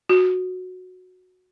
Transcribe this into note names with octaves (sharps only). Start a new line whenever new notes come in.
F#4